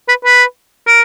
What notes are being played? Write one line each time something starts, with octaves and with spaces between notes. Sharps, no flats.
B4
B4
A#4